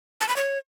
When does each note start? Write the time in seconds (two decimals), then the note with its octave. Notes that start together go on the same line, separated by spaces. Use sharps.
0.21 A5
0.29 B5
0.36 C#5